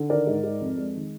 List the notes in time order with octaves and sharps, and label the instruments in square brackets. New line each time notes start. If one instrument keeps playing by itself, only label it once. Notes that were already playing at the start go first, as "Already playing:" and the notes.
Already playing: [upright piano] D3
D#3 A#4 D5
G#2
G#2
F2
G#3
D#3